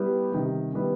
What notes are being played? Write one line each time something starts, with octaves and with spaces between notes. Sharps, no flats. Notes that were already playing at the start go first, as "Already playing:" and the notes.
Already playing: G3 B3 E4 G4
C3 D#3 G3
D#3 G3 B3 E4